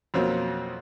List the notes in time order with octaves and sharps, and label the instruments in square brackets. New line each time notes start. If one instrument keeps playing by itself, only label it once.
[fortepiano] F2 B2 F#3 A#3 C4 C#4